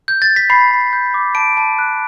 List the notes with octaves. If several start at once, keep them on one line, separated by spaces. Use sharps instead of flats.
G6
A6
B6
B5 C7
B5
G6
D6
A5 D7
A5
F#6